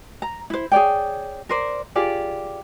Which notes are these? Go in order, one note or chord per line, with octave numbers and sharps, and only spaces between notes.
A#5
E4 C5
G#4 C#5 D5 G5
A#4 C5 D5
F4 G4 G#4 D5